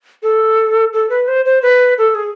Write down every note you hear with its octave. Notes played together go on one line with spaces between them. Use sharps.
A4
A4
B4
C5
C5
B4
A4
G#4